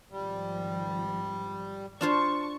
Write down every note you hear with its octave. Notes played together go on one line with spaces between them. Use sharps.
G#1 F3 G3
D4 F4 C5 A5 C#6